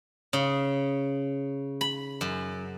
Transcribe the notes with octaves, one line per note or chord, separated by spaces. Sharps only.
C#3
B5
F#2